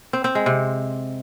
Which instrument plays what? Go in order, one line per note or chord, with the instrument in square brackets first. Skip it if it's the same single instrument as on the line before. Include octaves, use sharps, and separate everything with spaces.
[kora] C4
C4
G#3
C3